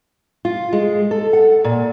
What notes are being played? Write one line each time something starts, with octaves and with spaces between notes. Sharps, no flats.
F4
G#3
A4
F#5
A#2